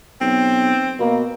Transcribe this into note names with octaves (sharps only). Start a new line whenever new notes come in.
B1 C4
B2 A#3